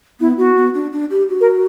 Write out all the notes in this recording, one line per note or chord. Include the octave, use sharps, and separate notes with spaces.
B3 E4
B3 F#4
B3
D4
D4
G4
F#4
A#4